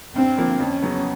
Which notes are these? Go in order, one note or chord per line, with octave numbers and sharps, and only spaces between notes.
G2 C4
D3 F3 A#3
F2 C#4
C#3 F#3 B3